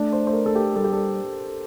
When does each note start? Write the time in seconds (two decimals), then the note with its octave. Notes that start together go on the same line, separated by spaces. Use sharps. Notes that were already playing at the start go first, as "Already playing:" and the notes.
Already playing: A3 D4
0.13 C5
0.27 C5
0.33 A#4
0.46 A4
0.55 G4
0.76 G3 A4
0.84 G4
0.93 A4